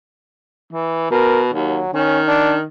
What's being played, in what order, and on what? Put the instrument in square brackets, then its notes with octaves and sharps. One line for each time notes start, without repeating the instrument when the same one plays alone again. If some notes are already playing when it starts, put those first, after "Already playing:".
[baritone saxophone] E3
[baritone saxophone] B2 [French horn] A#4
[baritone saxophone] D#2 [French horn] F#3
[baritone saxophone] D#3 [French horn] C#4
[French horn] D4